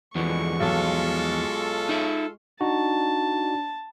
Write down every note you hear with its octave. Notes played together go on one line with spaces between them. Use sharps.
E2 B2 D3 E3 F3 G#3 A3 C#6
B1 F4 A4
D#4 E5
D4 D#4 F#4 A5